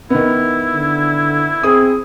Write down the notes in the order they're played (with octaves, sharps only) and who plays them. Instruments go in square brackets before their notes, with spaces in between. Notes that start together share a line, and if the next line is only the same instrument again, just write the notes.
[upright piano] D#3 B3 [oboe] E4
[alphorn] D3
[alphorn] C4 [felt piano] G#4 D#6